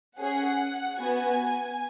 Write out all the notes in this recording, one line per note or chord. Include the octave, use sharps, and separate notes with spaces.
C#4 G#4 F#5
B3 F#4 G#5